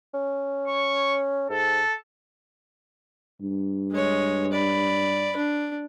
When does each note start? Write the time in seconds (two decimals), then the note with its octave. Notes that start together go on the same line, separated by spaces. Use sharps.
0.14 C#4
0.68 C#6
1.50 G#2 A4
3.42 G2
3.91 G#3 C#5
4.52 D5 B5
5.36 D4